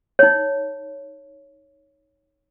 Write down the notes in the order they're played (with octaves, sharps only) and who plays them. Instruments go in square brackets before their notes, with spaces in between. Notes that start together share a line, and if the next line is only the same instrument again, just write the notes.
[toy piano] D#4 C#5